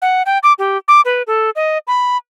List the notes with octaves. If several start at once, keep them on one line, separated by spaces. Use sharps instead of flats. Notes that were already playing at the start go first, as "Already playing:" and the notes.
F#5
G5
D6
G4
D6
B4
A4
D#5
B5